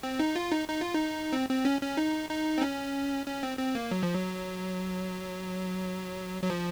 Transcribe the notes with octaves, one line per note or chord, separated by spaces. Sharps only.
C4
D#4
F4
D#4
D#4
F4
D#4
C4
C4
C#4
C#4
D#4
D#4
C4
C#4
C#4
C4
C4
A#3
F#3
F3
F#3
F#3
F3